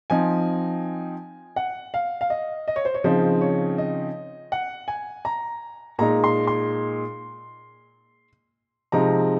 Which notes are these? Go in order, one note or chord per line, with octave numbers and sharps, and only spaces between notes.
F3 C4 D#4 G#5
F#5
F5
F5
D#5
D#5
C#5
C5
C#5
C#3 F3 C4 D#4 C5
C#5
D#5
F#5
G#5
A#5
A#2 G#3 D#4 A#5
C6
C6
C3 F3 G#3 C4 D#4 A#5